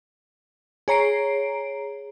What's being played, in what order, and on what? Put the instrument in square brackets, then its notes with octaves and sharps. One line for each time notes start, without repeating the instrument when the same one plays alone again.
[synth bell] G#4 C#5 A#5 C7 D7